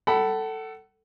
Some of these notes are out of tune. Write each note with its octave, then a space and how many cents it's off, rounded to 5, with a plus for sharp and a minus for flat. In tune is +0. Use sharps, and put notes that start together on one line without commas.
A4 +10 F#5 +35 B5 +0